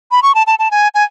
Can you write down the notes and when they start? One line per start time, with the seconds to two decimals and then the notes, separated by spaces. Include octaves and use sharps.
0.11 B5
0.23 C#6
0.35 A5
0.47 A5
0.59 A5
0.71 G#5
0.95 G#5